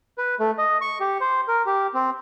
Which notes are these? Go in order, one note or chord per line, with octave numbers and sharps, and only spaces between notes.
B4
A3
D#5
C#6
G4
C5
A#4
G4
C4